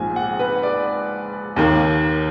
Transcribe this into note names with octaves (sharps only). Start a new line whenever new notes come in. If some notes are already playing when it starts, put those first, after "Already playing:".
Already playing: A#1 G#2 F3 G#5
F#5
B4
D5
D#2 D#3 A#3